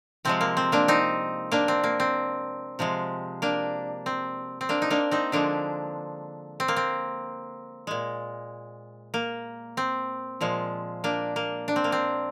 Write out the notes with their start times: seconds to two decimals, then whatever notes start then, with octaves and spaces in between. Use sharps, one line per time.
0.25 C3 F3 G#3 C4
0.41 A#3
0.57 C4
0.72 A#3 D4
0.88 C4 D#4
1.52 A#3 D4
1.68 C4
1.84 A#3
2.00 C4
2.79 C3 F3 G#3
3.42 A#3 D4
4.06 C4
4.61 C4
4.69 A#3 D4
4.82 D#4
4.90 A#3 D4
5.11 C4 D#4
5.32 D3 F3 G#3 A#3 D4
6.60 C4
6.68 A#3
6.76 C4
7.87 A#2 G#3
9.14 A#3
9.77 C4
10.41 A#2 F3 G#3
11.04 A#3 D4
11.36 A#3
11.68 D4
11.76 C4
11.84 A#3
11.92 C4